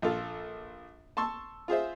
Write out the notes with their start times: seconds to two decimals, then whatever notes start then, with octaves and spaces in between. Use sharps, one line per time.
0.02 A#1 F4 A4
1.17 A5 C6 C#6 E6
1.68 F4 G#4 C5 E5